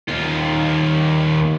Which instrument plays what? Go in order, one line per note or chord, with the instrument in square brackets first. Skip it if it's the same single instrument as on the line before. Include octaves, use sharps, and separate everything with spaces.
[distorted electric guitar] D#2 F4